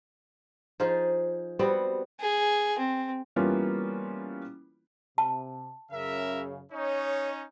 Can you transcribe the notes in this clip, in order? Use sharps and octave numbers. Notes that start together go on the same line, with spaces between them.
F3 D#4 F4 G#4
G3 B3 C4 F#4
G#4
C4
E3 G3 A#3 B3 C#4 F4
C3 A5
F#2 C#3 A#4 E5
C#4 D#4 C#5